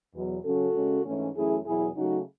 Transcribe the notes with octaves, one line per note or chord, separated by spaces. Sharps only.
E2 B2 F#3
C#3 F#3 C#4 F#4 A4
C#3 G#3 C#4
G#2 E3 A3 C#4
F#2 E3 A3 C#4 E4 G#4
E2 B2 F#3 E4 G#4
C#3 F#3 A3 D#4 F#4